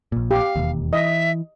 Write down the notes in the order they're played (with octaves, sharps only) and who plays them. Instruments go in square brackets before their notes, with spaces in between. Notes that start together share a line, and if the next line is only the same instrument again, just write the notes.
[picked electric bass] A#1 A#2
[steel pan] G4 [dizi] F5
[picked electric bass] E1 D#2
[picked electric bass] E3 [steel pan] D#5 [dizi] E5